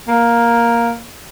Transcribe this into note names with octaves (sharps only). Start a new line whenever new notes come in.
A#3